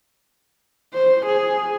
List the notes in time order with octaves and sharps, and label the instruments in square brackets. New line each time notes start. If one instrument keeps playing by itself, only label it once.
[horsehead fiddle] C5
G#4